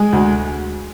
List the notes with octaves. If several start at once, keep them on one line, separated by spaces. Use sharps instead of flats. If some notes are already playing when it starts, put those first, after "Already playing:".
Already playing: G#3 G#5
D2